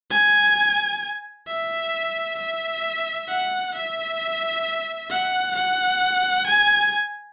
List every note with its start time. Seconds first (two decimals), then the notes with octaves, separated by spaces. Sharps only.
0.11 G#5
1.48 E5
2.38 E5
3.29 F#5
3.74 E5
5.10 F#5
5.55 F#5
6.46 G#5